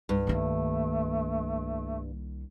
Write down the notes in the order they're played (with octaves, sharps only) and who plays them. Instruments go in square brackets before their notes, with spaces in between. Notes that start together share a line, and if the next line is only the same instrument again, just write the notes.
[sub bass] C2 [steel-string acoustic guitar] G2
[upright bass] D#3 A#3 [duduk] A3